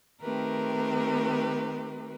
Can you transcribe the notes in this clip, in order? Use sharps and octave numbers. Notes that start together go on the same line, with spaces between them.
D#3 A3 C4 G4 A#4 B4